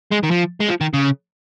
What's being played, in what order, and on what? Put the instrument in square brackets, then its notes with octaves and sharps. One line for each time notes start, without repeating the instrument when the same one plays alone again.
[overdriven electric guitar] G#3
D#3
F3
G#3
F3
D#3
C#3